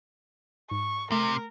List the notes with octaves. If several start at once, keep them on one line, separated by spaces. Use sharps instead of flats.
G#2 C#6
C3 A3 A#4